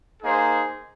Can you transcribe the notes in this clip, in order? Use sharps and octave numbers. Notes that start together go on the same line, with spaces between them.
A#3 D#4 G#4 C5